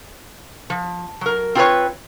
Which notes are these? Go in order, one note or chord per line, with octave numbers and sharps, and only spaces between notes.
F3
F#3 A#4
C4 F4 G4 A4 B4 C#5